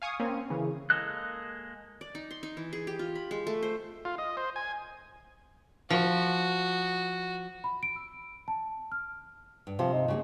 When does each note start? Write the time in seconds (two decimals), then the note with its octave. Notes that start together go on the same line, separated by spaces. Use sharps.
0.02 F5 G#5 C#6 D#6
0.20 A#3 C4 C#4
0.50 C#3 E3
0.90 G#3 A#3 A4 D#5 F#6
2.01 D5
2.15 D#4
2.31 C6
2.43 D#4
2.57 E3
2.73 G#4
2.87 G4
2.99 F4
3.15 B5
3.31 G#3
3.47 A3
3.62 C5
4.05 F4
4.18 D#5
4.37 C5
4.56 G#5
5.90 F3 F#4
7.64 B5
7.83 D7
7.96 E6
8.48 A5
8.92 F6
9.67 G2
9.79 C3 F3
9.93 D#4
10.08 C#3 G3 A#3